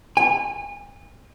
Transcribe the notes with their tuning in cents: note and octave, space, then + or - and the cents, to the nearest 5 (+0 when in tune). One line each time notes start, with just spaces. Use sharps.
G#5 -35